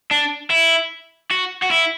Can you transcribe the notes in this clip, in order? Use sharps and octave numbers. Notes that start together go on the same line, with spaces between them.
D4
E4
F#4
F#4
E4